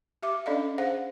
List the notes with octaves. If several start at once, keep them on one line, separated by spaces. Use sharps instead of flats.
G4 E5 D6
C#4 D4 A4 D5 D#5 F5
G#4 C5 F5 F#5